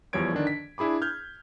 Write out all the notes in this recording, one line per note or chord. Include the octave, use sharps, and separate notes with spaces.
E2 F3 G3 C#5 G#6 D7
D3 D#3 D4
B6
D4 E4 G#4 B5 D6
F6 G6 G#6